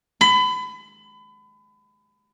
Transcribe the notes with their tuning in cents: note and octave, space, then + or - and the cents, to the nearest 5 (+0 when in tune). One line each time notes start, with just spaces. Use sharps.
B5 +30